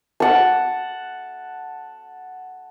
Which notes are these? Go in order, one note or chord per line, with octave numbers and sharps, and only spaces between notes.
F#5 A5